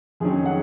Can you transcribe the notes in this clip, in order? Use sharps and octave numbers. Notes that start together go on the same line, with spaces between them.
F2 D#3 F#3 C#4 G#4
F#5